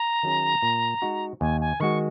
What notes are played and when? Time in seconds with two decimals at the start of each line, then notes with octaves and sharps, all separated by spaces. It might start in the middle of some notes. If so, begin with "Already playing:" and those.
Already playing: A#5
0.23 D#3 F#3 C#4 G#4
0.62 A#2
1.02 G#3 D#4 F#4
1.41 D#2 G#5
1.61 G#5
1.80 D#3 G#3 F#4 C#6